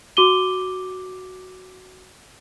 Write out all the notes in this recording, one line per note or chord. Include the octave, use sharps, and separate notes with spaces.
F#4 D6 D#7 G7